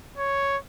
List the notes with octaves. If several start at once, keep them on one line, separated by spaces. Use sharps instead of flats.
C#5